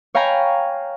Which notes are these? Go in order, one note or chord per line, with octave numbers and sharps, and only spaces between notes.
C#5 F5 G5 G#5 A#5 B5